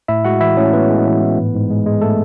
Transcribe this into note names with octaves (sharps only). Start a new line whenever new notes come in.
A2 E4 E5
G#3 F#4 F#5
E3 E4 E5
A2 C#4 C#5
A2 B3 B4
G#3
E3
A2
G#2
G#2
G#3
G#3
A3 A4